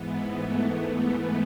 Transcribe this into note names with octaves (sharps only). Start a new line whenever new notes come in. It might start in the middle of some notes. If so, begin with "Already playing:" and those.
Already playing: G#2 E3 B3
A3
A3